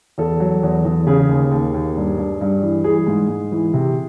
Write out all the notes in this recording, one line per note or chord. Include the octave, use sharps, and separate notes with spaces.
E2 A4
F#3
E2
E2
C#3 G#4
D#2
D#2
D#2
G2
G2
G2
E3
E3 G#4
G#2
G#2
E3
C3